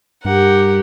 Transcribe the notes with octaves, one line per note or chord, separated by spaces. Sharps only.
G2 G4 A#4 F#5